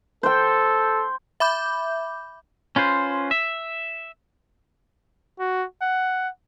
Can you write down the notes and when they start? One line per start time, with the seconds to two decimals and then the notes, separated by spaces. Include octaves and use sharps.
0.23 A4 C5 G5
1.40 E5 B5 D6 G6
2.76 C#4 F4 B4 C5
3.31 E5
5.39 F#4
5.82 F#5